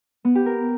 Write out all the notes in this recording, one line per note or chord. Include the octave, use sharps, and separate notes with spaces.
B3
G4
A#4